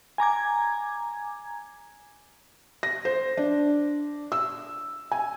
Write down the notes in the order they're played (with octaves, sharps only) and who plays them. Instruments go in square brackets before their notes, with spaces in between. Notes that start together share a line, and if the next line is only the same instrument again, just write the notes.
[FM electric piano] G#5 A#5 D6 G#6
[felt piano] A#6
C5
D4
E6
G#5